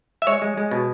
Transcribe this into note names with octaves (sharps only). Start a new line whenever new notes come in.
E5
G#3 C#5
G#3
G#3
B2